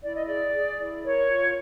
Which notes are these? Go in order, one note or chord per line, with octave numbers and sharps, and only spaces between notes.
E4 D5
D#5
G#4 D5
G#4
E4
A#4 C#5
F4